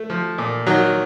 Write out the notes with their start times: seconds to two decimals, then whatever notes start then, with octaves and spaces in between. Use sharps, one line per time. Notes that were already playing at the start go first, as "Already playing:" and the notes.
Already playing: A3
0.10 F3
0.38 A#2
0.67 D#3 F#3